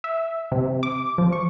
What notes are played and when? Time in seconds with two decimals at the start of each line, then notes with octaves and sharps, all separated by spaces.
0.04 E5
0.52 C3
0.83 D6
1.18 F3
1.32 C#6